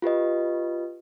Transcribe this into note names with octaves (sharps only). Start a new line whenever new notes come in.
F4 G4 B4 D#5